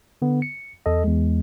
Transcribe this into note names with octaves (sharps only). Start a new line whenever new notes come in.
D3 B3
C#7
E2 A4 D#5
E2 G#3